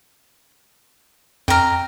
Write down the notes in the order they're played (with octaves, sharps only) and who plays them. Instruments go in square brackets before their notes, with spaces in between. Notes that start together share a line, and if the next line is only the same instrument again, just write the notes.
[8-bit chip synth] F2 F6 [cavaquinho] G5 A#5